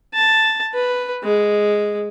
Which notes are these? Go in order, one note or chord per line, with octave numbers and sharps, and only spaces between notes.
A5
B4
G#3